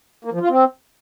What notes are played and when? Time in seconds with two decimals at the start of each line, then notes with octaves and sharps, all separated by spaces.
0.25 A#3
0.33 F3
0.41 F4
0.49 C4